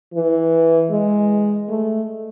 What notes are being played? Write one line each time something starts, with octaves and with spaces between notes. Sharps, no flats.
E3
G#3
A3